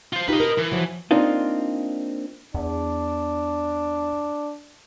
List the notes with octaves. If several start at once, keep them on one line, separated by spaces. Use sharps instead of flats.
F4 C5
D#4 F4 G4 B4 D#5
A#4
E3
F3 F#3
A#3 C4 D4 D#4 F4
E2 D4